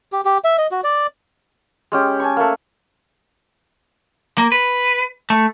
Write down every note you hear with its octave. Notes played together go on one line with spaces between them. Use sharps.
G4
G4
E5
D#5
F#4
D5
G#3 C#4 G4
G#5 A5 C#6
A3 A#3
A#3
B4
A3